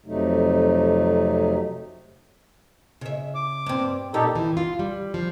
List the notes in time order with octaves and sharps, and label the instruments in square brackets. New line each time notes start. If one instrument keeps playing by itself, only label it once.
[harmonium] F2 C3 F#3 A3 D#4
[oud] C#3 E5
[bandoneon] D6
[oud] G2 C4
[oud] A#2 [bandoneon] D#4 G4 A4
[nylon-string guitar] E3
F4
G3
F3